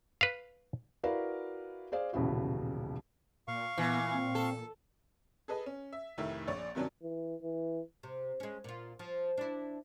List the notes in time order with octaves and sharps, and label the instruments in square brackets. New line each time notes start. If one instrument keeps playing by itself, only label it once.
[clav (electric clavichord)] B4 F5
[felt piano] E4 F#4 A#4 B4 D5 F5
G#4 C5 D5 F5
D#1 B1 C#3 E3 E4 F#4
[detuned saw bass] A#2 [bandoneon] F5 C#6
[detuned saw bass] A#2 [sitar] E3 [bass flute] B3
[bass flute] C4
[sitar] A4
[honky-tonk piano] G#4 A4 B4 D#5
C#4
E5
F1 A2 D#3 E5
A#1 C#5 D5 A6
G2 C3 D#3 F#3 C#4 D4
[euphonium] E3
E3
[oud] C3
G#3 C#4
A#2 F4
F3
D4 E4